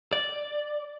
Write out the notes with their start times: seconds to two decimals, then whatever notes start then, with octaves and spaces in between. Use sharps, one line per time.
0.13 D5